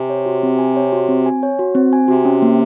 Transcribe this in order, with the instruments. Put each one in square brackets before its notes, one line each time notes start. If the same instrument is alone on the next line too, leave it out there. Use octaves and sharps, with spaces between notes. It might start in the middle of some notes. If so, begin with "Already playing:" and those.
Already playing: [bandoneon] C3 [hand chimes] G#5
[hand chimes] C#5
F#4
C4
G#5
C#5
F#4
C4
G#5
C#5
F#4
C4
G#5
[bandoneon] C3 [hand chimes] F#4
[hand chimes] C#4
A#3